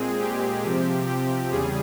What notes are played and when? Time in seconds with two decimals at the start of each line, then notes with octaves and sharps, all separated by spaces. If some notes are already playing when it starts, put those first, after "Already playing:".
Already playing: A#2 G#3 C4 G#4
0.18 G4
0.62 C3 F3 C4
1.07 G4
1.51 E2 C#3 G3 G#4